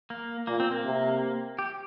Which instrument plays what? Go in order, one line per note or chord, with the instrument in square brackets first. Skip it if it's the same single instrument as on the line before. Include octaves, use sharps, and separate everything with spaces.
[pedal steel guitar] A#3
[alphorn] A#2 [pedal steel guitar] A#3
[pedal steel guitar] C4
A#3
[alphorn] C3
[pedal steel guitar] G4